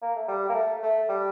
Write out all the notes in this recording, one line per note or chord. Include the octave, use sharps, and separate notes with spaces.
A#3
A3
G3
A#3
A3
A3
G3